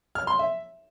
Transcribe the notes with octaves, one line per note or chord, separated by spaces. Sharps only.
F6
C6
E5